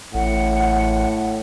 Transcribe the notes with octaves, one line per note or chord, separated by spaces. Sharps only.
A1 A2 F#5